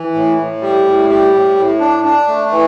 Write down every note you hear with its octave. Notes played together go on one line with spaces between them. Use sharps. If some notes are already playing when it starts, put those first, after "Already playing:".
Already playing: E3
A2
A2
G3
A2
G3
A2
A2
D4
D4
A3
E3